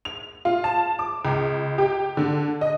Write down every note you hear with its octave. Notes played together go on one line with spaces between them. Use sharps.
F7
F4
A5
D6
C#2
G4
D3
D#5